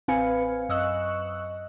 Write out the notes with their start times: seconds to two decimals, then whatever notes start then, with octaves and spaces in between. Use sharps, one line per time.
0.08 A1 C4 B4 F5 G#5 C#7
0.69 F#2 D#5 C#6 E6 F#6